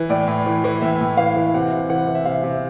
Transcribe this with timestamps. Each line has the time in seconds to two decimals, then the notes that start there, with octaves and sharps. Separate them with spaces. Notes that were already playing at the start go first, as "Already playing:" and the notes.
Already playing: E3
0.09 A2 D5
0.28 A2
0.46 E3
0.64 E3
0.81 A2 E5
1.01 A2
1.17 E3 F5
1.36 E3
1.54 C3 F#5
1.72 C3
1.89 E3 F#5
2.08 E3
2.15 E5
2.25 C3 F5
2.43 C3